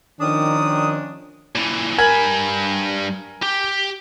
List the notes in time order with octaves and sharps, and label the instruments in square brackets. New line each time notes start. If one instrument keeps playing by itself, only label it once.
[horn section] D#3 [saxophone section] F3 C#4 D4 [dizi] D#6
[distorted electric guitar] A#2 E3
[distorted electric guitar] G2 B5 [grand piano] A#4 G#5 G#6
[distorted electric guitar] G4